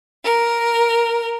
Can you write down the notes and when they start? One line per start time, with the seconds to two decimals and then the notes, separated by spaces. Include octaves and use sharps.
0.24 A#4